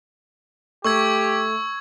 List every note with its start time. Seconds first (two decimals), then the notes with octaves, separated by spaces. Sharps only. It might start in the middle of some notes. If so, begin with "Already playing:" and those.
0.84 A3 G4 C#6 E6 G#6